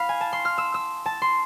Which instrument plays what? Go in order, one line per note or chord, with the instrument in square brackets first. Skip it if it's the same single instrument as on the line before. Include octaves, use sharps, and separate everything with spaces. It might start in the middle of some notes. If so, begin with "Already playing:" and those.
Already playing: [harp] F5 B5
G#5
A5
C6
F6
E6
E6
A5
C6